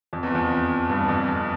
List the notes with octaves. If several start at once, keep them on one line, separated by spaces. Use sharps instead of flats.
F2
E2
F2
G2
F2
F2